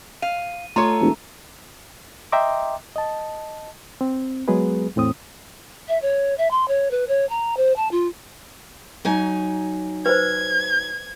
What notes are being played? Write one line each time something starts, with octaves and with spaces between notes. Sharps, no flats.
F5 D#7
A3 F4 A4 C#5 A#5
E1
D#5 E5 G5 A#5 C6 D6
D#5 A5
C4
F#3 G#3 B3 G#4 B4
E2 A2 C4 D#6
E5
C#5
E5
C6
C#5
B4
C#5
A#5
C5
A5
F4
F#3 D#4 G#5
B4 C5 G#6